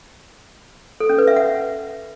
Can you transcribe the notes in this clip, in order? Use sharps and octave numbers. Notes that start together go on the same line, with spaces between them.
A4
C#4
B4
E5
F#5